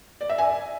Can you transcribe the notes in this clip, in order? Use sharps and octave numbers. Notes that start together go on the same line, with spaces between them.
D5
E5
G#5